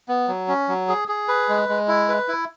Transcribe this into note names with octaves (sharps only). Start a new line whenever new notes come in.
B3
F#3
C#4
F#3
G#4
G#4
B4
G#3
G#3
E4
B4
E4